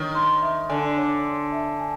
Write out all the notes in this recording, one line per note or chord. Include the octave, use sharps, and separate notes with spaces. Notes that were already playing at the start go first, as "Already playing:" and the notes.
Already playing: D#3 C#5
C6
E5
D3 G#5
C#5
C6
E5
G#5